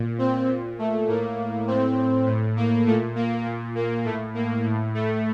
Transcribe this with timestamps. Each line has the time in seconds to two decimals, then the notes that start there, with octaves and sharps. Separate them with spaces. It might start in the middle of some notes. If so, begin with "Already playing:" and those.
Already playing: A#2
0.18 C4
0.48 A#2
0.79 A3
1.08 A2 A#3
1.67 A2 C4
2.26 A2
2.56 A#3
2.86 A#2 A3
3.15 A#3
3.46 A#2
3.75 A#3
4.05 A2 A3
4.34 A#3
4.64 A2
4.94 A3